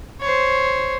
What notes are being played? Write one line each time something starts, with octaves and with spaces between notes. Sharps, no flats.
C5 C#5